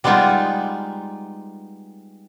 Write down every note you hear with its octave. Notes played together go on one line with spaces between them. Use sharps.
G3 G#3 B3 D#4 F4